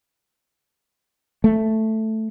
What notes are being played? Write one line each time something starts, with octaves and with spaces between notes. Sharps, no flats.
A3